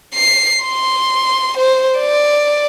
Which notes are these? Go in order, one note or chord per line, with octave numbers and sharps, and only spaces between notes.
C7
C6
C5
D5